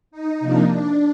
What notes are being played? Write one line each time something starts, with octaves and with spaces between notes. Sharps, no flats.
D#4
C3 F3 A#3 D4
D4